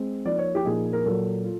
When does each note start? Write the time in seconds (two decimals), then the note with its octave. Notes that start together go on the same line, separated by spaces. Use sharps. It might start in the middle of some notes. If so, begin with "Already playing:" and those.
Already playing: G#3 C4
0.25 F3 A#3 D#4 D5
0.38 C#5
0.55 G4
0.65 A#2 F3 A#3 D#4 G#4
0.93 A#4
1.05 A#2 F#3 A#3 A4
1.44 F4